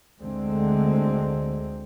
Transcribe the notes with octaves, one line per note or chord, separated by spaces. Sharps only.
D2 D3 G#3 C4